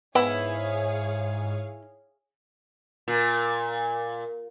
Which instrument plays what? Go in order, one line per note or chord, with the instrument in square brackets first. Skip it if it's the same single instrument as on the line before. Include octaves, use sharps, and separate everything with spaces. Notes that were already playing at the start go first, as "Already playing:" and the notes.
[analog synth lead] G#2 [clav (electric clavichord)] B3 [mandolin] E4 [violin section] G#4 C#5 F5
[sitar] A#2